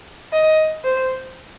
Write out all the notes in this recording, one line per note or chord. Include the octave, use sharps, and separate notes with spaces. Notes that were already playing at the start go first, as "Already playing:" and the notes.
D#5
C5